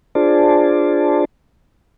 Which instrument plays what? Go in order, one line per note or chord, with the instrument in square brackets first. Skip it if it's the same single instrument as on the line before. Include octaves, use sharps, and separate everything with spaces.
[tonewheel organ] D4 F4 G#4 C5 D5 A5